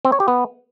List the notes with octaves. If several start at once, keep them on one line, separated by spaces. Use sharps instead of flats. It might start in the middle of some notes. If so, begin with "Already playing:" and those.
C4
C#5
G4
B3